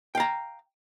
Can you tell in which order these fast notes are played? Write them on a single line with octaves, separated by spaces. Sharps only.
G5 F5 A#5